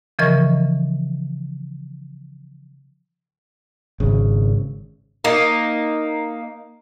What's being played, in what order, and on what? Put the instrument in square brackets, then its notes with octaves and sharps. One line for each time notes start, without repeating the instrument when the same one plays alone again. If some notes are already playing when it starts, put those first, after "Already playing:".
[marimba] C#3 E3 F3 A#4 D#5 C#6
[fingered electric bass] G#1 C#3
[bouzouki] A#3 D#4